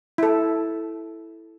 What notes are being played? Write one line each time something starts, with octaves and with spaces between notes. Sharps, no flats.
E4 A4